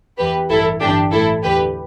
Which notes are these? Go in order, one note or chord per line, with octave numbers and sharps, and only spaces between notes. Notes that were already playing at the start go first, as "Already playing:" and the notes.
E2 E3 G4 B4
A1 G2 E3 E4 A4
G1 G2 E3 D4 G4
A1 A2 E3 E4 A4
E2 D3 G4 B4